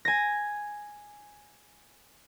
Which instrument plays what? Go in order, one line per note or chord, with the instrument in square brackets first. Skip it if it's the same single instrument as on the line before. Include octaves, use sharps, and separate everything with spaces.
[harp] G#5 A#6